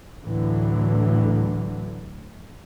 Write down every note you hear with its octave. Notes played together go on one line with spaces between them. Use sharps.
D2 A2 D3 E3 F#3